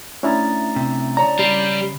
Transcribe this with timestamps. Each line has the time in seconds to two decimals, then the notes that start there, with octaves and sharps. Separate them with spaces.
0.23 A3 C#4 D4 E4 A#5 A6
0.76 C3
1.17 C#3 C#5 D5 A5 A#5
1.39 G3 B5 C7